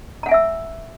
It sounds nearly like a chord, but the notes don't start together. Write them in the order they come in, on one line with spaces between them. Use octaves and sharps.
A#5 F#5 G#5 E5 E6